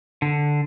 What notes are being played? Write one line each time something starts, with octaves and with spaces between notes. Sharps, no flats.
D3